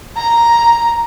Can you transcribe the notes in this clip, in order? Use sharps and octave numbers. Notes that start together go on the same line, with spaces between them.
A#5